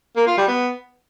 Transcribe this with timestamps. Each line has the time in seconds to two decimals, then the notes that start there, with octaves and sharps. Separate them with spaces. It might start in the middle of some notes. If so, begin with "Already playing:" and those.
0.16 A#3
0.27 F4
0.37 G3
0.48 B3